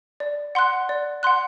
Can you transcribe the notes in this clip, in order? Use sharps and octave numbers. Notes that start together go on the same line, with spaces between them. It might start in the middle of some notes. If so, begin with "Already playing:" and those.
D5
F#5 C6 F#6
D5
F#5 C6 F#6